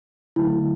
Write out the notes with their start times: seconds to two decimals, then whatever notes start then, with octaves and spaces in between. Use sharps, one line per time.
0.36 D3 F#3 A3 E4